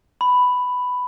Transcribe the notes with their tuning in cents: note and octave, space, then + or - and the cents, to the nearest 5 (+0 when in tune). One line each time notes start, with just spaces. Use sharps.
B5 +5